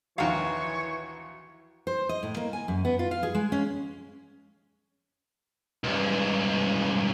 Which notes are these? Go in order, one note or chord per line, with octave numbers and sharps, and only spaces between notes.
A#1 D#2 E3 F#4 C#5 F5
C5
D#5
A2
A#3
G#5
F#2
B3
F4
F5
G#4
G#3
C#4
C#2 G2